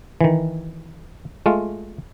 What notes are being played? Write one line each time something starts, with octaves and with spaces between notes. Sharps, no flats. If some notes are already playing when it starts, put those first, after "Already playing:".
D#3 E3
G#3 A3 F4